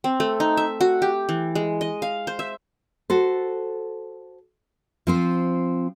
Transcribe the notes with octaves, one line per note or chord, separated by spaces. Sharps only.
C4
A3
D#4
E5
F#4
G4
E3
G#3
D#5
F5
C5
E5
F#4 A4 C5
F3 C4 C5